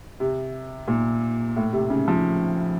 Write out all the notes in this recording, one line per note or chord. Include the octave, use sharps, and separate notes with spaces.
C3
A#2
A2
C3
C#3
F3